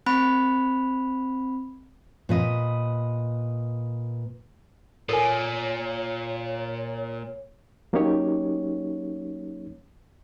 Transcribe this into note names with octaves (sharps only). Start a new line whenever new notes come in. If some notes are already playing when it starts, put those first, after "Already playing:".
C4 B5
A#2 B4 D#5
A#2 A4 A#4 C#5 G#5
F#3 A#3 C#4 D#4 G4 C#5